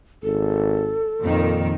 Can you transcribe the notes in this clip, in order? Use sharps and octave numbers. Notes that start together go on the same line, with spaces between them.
G#1 A4
F2 A#2 D#3